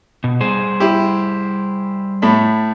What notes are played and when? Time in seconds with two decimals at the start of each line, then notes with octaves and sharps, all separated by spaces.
0.24 B2
0.41 G3 G#4 C5
0.80 E4 G4
2.22 A2 A3 B5